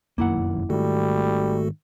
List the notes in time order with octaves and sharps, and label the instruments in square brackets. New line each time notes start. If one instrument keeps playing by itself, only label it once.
[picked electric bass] F1 F#2 D#3 [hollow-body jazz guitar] A#3 E4 F#5
[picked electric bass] G#2 D#3 [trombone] G3 [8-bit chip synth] A3 F#4 A4